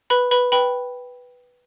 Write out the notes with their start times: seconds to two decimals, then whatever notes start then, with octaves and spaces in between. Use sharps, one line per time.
0.10 B4 B5
0.31 B4 B5
0.52 B4 G5 B5